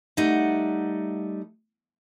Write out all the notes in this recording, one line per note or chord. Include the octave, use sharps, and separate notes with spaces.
G3 A3 D#4 F#5